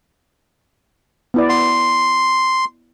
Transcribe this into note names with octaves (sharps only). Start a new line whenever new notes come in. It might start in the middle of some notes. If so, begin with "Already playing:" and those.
B3 E4 D5
F#5 C6